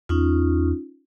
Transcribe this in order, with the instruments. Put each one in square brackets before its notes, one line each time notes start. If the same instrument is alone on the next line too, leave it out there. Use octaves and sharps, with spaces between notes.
[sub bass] E2 [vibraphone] C#4 D#4 F4